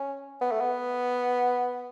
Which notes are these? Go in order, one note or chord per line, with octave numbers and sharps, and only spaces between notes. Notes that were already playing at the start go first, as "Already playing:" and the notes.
Already playing: C#4
B3
A3
B3